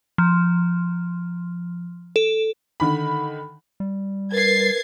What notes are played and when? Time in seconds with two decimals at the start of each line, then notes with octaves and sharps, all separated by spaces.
0.18 F3
2.16 A4
2.80 D3 D#3 B5
3.80 G3
4.32 A#4 B4 G#6 A6 C7